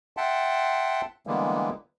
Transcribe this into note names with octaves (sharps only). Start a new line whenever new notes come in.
E5 F#5 G5 A5 C6
D3 E3 G3 G#3 A#3 B3